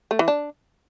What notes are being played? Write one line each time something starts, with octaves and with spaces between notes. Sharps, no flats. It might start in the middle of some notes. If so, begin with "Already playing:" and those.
A3
E3
D4